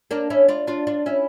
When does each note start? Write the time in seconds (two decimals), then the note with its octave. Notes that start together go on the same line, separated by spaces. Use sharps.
0.11 A#3 D4
0.30 C#4 E4
0.48 D4 F4
0.67 D4 F4
0.87 D4 F4
1.06 C#4 E4